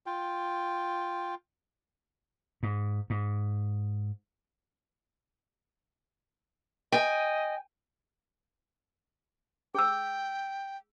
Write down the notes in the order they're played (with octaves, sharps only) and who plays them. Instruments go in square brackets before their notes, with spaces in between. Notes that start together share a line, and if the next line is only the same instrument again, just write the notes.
[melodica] F4 G5
[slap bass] G#2
G#2
[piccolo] D#5 [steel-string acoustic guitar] G5 G#5
[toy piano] G#4 E6 [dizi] G5